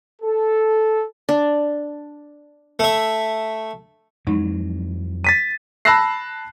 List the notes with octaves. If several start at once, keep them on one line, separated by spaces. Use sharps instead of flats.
A4
D4
A3 E5
F2 E3 F#3 G#3 D#4
A6 B6 D#7
A5 B5 E6 F#6 A#6 C7